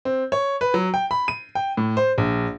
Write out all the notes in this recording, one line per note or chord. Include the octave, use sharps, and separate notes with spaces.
C4
C#5
B4
F#3
G5
B5
D#7
G5
A2
C5
A#1